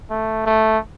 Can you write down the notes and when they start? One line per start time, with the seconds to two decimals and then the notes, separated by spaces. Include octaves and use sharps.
0.10 A3
0.46 A3